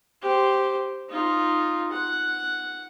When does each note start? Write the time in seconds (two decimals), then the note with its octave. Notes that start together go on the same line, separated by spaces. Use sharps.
0.22 G4 C5
1.09 D#4 F4
1.92 F#5